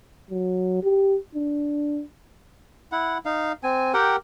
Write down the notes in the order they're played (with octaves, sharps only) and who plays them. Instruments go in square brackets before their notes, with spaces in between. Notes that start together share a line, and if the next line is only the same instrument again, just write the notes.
[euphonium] F#3
G4
D4
[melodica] E4 F#5
D#4 F5
C4 G#5
G4 A#4 F#5 G5